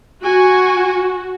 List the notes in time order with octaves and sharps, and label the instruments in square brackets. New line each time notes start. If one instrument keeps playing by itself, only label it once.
[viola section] F#4 [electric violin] G#5 C#6